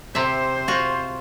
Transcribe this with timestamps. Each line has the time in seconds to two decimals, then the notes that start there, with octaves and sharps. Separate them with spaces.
0.15 C3 C5 E5
0.68 F4 F#4